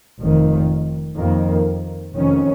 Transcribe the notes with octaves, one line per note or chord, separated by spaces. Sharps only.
F1 F2 D#3
F2 D#3 A#3
F1 F2 D#3 C#4